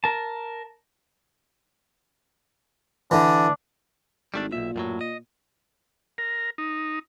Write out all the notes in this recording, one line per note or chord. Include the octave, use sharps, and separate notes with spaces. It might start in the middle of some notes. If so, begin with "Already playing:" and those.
A#4 A5
D3 E3 D4
G#1 G3 A3 D4
B1 E2 A#2 E5
F#2 A2 F#3
D#5
A#4
D#4